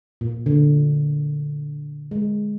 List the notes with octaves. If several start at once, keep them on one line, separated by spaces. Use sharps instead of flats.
A#2
D3
G#3